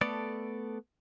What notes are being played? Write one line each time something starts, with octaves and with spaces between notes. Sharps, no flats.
A3 B3 A4 D5